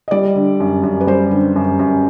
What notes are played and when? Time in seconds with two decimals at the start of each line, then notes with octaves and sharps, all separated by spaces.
0.08 D#5
0.11 G3 D5
0.35 D3
0.60 F#2
0.83 F#2
1.01 B4
1.07 G3 C5
1.31 D3
1.56 F#2
1.79 F#2